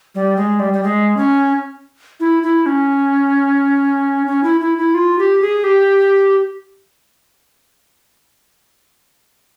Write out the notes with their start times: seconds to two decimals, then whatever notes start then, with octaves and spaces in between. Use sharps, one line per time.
0.15 G3
0.37 G#3
0.60 G3
0.73 G3
0.83 G#3
1.17 C#4
2.20 E4
2.43 E4
2.66 C#4
4.27 C#4
4.43 E4
4.61 E4
4.78 E4
4.95 F4
5.19 G4
5.42 G#4
5.64 G4